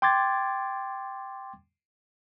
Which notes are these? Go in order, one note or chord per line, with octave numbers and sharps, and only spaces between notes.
G5 C6 D6 G#6 A6